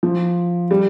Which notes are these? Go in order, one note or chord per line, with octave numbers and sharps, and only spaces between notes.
F3
G3